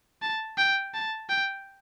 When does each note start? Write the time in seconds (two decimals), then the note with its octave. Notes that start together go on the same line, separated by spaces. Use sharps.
0.22 A5
0.58 G5
0.94 A5
1.29 G5